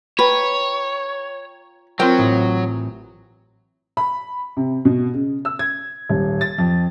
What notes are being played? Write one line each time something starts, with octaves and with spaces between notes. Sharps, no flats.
F4 B4 C#5 G5 A#5
F#3 C4 F4 A#4 C5 G5
A1 A2 D#6
B5
C3
B2
C#3
E6
G#6
D#1
A6
F2